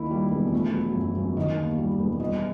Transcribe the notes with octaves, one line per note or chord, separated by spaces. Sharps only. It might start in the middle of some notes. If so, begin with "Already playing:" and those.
Already playing: D#2 D#3 E4
G3
E1
A3
F#3
F#2
F#2
D#3 D#5
D#2
G3
E1
G3 D#5